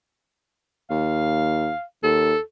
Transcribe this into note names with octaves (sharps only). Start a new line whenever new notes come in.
D#2 F5
D#2 A4